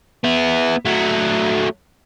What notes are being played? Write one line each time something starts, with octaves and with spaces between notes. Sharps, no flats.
B3 E4
F#3 A3